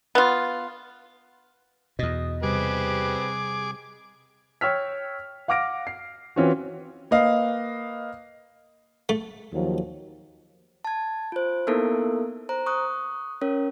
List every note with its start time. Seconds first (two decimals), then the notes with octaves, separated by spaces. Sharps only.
0.15 B3 F4
1.99 E2 B2 D#5
2.43 C3 G3 C4 G4 G#4 B4 D6
4.61 C#5 G5 E6 F6 B6
5.48 F5 F#5 D6 F6 A#6 D7
5.87 C7
6.36 E3 C4 C#4 F4 F#4
7.11 A#3 B4 D#5 F5
9.09 A3
9.52 D#2 F3 F#3
10.85 A5 G#6
11.32 F4 C5
11.67 A#3 B3 D#4 E4 A4 A#4
12.49 C5 A#5
12.66 C#6 D#6 F#6
13.42 C#4 A#4 C#5